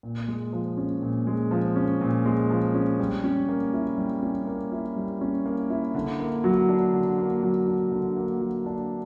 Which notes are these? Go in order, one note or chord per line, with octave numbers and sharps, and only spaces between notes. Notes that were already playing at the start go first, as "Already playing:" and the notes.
A#2
G#3
F3
C#4
A#2
G#3
F3
C#4
A#2
G#3
F3
C#4
G3
C#4
A#3
E4
G3
C#4
A#3
E4
G3
C#4
A#3
E4
D3
A#3
F#3
D4
D3
A#3
F#3
D4
D3
A#3
F#3
D4